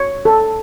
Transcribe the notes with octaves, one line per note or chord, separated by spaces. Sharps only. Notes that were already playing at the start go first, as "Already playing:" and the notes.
Already playing: C#5
A4